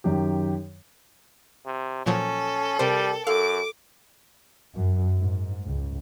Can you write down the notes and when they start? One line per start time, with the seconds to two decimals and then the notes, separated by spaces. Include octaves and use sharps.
0.04 F#2 D#3 G4
1.66 C3
2.06 A#2 F3 F#3 C#4 A4
2.79 C3 G3 A#4 C5 G5
3.27 F#2 A4 F5 D6
4.76 F#2
5.18 G#2
5.67 C#2